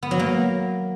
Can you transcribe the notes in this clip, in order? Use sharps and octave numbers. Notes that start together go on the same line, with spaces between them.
B3
F#3
A#3